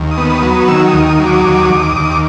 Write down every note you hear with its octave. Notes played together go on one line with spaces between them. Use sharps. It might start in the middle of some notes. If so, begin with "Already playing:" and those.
Already playing: D#2
D#6
B3
D#6
F#3
D#6
D#3 E6
D#6
D#2
D#6
F#3
D6
D#6
D6
D#2 D#6
D6
D#6
D#2 D6
D#6
D6
D#6
D#2 D6
D#6
D6